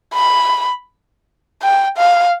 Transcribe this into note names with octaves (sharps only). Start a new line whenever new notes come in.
B5
G5
F5